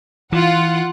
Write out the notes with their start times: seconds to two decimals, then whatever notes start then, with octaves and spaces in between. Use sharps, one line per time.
0.32 E3 F4 F#5